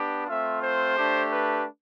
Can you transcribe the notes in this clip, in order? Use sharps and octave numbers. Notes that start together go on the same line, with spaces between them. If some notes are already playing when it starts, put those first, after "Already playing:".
Already playing: B3 D4 G4
A3 C4 F4 E5
C5
A3 D4 G4
B4